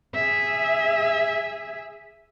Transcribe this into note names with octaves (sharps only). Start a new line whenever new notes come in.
G#4 E5